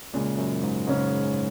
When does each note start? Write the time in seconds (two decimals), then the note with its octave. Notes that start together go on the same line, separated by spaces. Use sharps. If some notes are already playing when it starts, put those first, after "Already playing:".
0.14 A#2 C#3 G#3 C#4
0.38 F#2
0.63 G#2
0.87 G#2 C#3 G#3 C#4